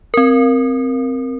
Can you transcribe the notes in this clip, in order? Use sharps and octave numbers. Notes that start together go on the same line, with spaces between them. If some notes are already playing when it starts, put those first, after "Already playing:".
C4 A#4